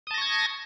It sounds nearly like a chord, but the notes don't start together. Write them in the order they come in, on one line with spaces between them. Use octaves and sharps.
D#6 A5 A#6 C#6 G#6